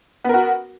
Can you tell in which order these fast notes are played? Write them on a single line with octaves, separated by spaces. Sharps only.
B3 A#4 F#4